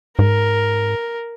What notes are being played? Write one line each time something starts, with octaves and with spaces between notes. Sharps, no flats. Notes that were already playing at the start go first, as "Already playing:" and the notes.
G#2 A#4